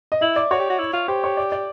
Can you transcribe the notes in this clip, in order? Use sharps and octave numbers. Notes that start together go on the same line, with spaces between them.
D#5
E4 E5
D5
F#4 C#5
G4
F#4
E4
F4
G4 C5
C#5
D5
D5